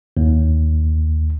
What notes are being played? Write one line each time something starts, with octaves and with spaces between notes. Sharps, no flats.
D#2